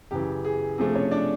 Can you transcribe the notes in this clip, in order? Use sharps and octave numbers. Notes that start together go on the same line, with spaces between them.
F#2 C#3 E3 G4
G#4
C3 F3 A3 D4 G#4
C#4 C#5
D4 D5